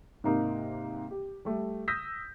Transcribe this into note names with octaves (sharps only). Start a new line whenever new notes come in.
G#2 C3 A#3 D#4
G4
G3 A3
D#6 E6 G6 A#6 B6